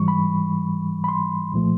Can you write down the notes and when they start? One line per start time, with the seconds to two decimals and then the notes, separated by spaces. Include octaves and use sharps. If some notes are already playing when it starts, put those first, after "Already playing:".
Already playing: G#2 E3 G3 C#6
0.08 B5
1.04 B5
1.08 C6
1.52 C2 A#2 F3 A3